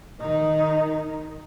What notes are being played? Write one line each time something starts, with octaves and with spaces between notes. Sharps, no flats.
D#3 D#4